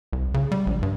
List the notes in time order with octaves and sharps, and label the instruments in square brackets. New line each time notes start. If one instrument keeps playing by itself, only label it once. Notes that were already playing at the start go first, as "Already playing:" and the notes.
[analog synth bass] C2
C#3
G3
A#1
G2